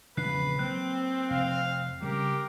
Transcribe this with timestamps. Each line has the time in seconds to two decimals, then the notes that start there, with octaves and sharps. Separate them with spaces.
0.17 E1 A#1 C#3 B4 F#6 C7
0.59 F#3 A#3 C4 F#6
1.30 F1 F5
2.02 C#3 G3 G4 A#4